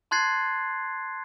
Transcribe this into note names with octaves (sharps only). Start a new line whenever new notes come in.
A5 C6 F#6 G#6 A6 C7